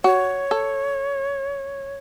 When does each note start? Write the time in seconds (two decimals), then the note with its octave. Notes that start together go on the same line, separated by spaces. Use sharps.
0.04 F#4 C#5
0.51 A4